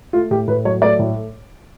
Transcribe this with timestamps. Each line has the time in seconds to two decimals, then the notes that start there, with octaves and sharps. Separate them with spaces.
0.13 A3 F4
0.31 A2 G4
0.48 A2 B4
0.65 F#3 C#5
0.82 A3 D5
0.99 A2